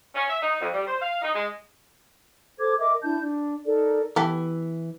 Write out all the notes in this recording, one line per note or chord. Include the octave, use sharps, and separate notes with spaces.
C#4
E5
D#4
F2
G3
C5
F5
D#4
G#3
A4 C5 D6 G#6
A#4 D#5 E5 D6
D4 E4 A5 G6
D4
D#4 A4 A#4 D5
E3 B3 G4 A4